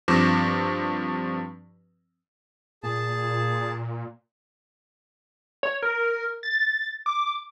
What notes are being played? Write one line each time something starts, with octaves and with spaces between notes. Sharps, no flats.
G2 F3 C4 D6 A#6 E7
A#2 G#4 A5
C#5
A#4
A6
D6